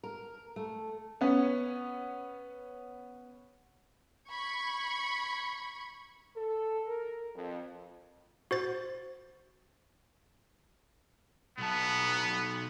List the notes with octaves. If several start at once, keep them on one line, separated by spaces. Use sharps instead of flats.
A#4
A3
B3 C#4
B5 C#6 G#6 C#7
A4
A#4
F2
F#4 C5 A6
B1 B3 A5